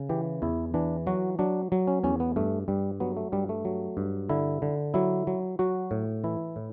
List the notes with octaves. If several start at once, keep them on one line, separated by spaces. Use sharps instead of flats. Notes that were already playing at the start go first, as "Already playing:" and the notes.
Already playing: C#3
E3 G4
E2 E4
E3 D4
F#3 F#4
F#3 D4
F#3
C#4
E2 C#4
B3
G2 A3
G2 G3
F#3 B3
A3
G2 G3
A3
F#3
G2
D3 E4
D3
F#3 E4
F#3
F#3 F#4
A2
E3 E4
A2